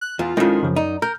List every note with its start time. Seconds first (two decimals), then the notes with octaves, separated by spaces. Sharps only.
0.01 F#6
0.19 E2 F4
0.37 F2 D#3 G#3 C#4 E4
0.63 F#2 C#3 F3
0.76 D#4 D5
1.02 A#4 A#5 F6 G6